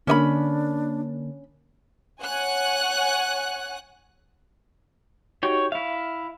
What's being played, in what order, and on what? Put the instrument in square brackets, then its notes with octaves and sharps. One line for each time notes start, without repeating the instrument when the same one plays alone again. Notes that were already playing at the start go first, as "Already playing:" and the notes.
[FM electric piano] D3 A#3 [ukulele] C#4 D5 B5 [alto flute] D4
[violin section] C#5 F#5 G#5 F#6
[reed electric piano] D#4 F#4 G4 [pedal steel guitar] C#5 G5
[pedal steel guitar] E4 F5 [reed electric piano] E5